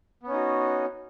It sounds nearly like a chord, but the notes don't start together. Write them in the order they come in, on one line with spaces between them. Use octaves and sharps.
B3 C#4 D#4 F#4